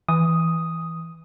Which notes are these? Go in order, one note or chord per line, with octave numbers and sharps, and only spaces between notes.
E3 D#6